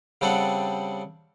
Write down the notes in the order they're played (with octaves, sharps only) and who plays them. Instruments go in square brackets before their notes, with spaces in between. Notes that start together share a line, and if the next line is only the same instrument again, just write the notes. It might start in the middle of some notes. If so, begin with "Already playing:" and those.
[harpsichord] C#3 G3 C4 D4 A4 F#5